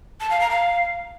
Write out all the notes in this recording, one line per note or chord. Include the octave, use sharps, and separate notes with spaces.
A5
F5
A#5
F5